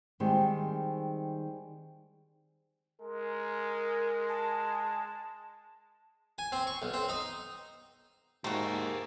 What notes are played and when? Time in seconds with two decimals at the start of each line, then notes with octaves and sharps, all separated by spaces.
0.20 D#3 G3 G#3 C4
3.01 G#3 A#4
4.29 A5
6.38 G#5
6.52 C4
6.67 C#6
6.82 B1
6.94 C4
7.09 D#4
8.44 G#2 A3 A#3 F#4 G4 A#4